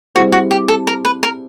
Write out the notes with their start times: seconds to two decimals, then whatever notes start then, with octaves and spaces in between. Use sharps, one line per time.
0.15 G3 C4 E4 F#4 G#4 C5
0.32 F#4
0.51 G4
0.68 A4
0.87 A#4
1.05 B4
1.23 A#4